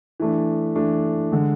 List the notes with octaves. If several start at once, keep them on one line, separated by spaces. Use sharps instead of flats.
E3 A3 D4
E3 A3 D4
D3 G#3